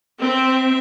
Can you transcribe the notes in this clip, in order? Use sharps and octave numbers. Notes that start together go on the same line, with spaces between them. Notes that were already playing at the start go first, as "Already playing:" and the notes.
C4 E5